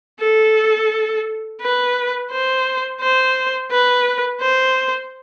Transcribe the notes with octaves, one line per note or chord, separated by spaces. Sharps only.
A4
B4
C5
C5
B4
C5